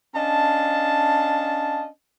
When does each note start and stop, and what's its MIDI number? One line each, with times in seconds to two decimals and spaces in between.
0.15 1.87 61
0.15 1.87 62
0.15 1.87 75
0.15 1.87 77
0.15 1.87 81